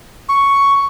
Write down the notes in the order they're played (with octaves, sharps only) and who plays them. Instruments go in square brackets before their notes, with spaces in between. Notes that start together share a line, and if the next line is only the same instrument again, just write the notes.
[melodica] C#6